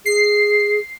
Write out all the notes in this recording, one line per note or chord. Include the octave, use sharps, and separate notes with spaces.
G#4 C7